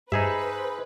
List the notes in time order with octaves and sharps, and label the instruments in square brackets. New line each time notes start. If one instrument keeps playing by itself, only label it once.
[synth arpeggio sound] G2 [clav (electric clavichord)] D#4 G#4 E5 [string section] B4 [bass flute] C5